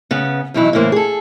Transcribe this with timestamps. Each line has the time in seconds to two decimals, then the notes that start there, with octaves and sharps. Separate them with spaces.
0.11 C#3 B3
0.54 F#2 B2 D#3 E3 F#3 E4
0.73 A2 C#3 E3 A#3 C5
0.92 G#4 A4